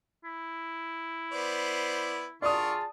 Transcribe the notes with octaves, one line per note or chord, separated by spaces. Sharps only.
E4
B3 C5 D5
D3 F4 G#4 A#4 D5 A5 C#6 D#6